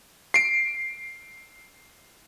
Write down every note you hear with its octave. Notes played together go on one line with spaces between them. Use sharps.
C7 D7